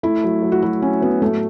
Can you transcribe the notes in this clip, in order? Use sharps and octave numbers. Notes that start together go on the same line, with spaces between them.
A3 E4
F#3
F#3
F#4
F#3 E4
C#4 F#4
F#3 B3
A2 A3